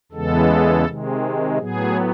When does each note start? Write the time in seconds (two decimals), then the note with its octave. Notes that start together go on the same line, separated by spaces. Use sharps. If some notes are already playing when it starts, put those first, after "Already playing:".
0.12 E2 C#3 E3 G#3 B3 A4
0.85 C3 D#3 G#3
1.59 A2 F#3 B3 G#4